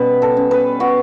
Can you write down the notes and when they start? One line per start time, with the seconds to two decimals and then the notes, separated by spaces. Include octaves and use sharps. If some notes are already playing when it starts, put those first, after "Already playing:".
Already playing: B2 G3 C#4 G4 B4
0.22 A4
0.37 C#4
0.51 B4
0.80 B3 F#4